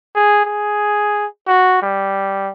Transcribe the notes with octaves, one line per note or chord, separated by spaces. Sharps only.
G#4
G#4
F#4
G3